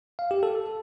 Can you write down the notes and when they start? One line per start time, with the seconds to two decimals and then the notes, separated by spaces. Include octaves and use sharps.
0.19 F5
0.31 G4
0.43 A4